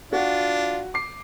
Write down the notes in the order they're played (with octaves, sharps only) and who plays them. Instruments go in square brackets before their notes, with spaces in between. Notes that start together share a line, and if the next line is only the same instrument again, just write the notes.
[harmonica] D4 F4 [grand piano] F#4
[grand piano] D6 C7